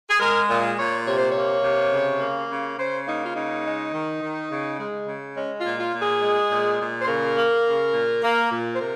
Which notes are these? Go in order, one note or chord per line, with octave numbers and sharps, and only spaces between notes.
G#4
G#3 A#4
A#2
A#2 C#5
C3 C#5
C5
A#3 C#5
C3
C#3
A#3
C#3
C#3 C5
A#3 D#4
F4
C#3 D#4
G#3
D#3
D#3
C#3
G#3
C#3
G#3 C#4
F4
A#2
F4
A#2
G#4
G#3
A#2
A#2
C5
C#3 A#4
A#3
C#3
A#2
A#3
A#2
C5
C3 A#4